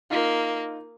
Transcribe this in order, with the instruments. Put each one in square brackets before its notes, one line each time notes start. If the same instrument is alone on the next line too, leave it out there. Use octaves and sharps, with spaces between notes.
[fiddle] A#3 [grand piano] D#4 F4